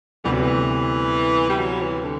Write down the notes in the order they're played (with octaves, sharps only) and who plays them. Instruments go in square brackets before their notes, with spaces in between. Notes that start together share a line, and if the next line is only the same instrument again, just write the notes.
[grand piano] D2 C3 G3 B3 [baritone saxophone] E3
[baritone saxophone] F#3
E3
G3
F#3
E3
D3